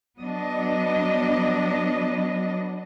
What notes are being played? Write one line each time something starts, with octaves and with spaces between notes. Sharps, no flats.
F#3 B3 D4 D#5